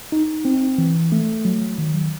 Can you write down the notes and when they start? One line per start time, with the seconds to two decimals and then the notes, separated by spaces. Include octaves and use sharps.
0.12 D#4
0.45 C4
0.78 E3
1.12 A3
1.45 F#3
1.78 D#3